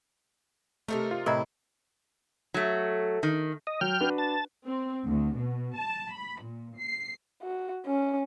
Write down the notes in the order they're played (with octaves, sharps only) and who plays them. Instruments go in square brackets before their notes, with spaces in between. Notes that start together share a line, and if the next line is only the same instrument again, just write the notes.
[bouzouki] C3 D#4 A#4 [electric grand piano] A3 A4
[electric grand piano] F4
[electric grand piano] A2 C3 G#6 [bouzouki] E4 [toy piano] A#4 D#5 A#5
[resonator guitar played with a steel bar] F#3 A3
D#3
[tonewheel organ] D#5
[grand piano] F#3 [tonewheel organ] G5 F6
[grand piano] D4 F#4 B4
[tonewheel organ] A5
[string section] C4
D2
B2
A5
B5
A#2
C7
[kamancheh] F#4
C#4